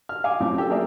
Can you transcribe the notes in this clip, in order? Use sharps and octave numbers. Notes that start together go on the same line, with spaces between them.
F6
F5 G#5 D6
F#2 A2 F3 C4 C#4 D6
G4 A4 E6
F#3 A#3 G#4 A4 D5 E5